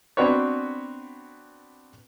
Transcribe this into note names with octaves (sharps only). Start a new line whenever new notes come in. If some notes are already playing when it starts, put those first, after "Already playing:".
B3 C4 D4 F#4 B4 C#5